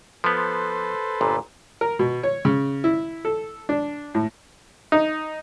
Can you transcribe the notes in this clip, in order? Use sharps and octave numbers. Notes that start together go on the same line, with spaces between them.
F3 B3 A4 B4 C5
G1 A#2
A#4
B2
C#5
C#3
E4
A4
D4
A2
D#4